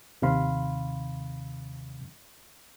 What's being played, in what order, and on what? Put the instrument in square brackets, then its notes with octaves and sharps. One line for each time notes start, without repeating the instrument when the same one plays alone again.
[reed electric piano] D#2 C3 D#3 F5 B5 C6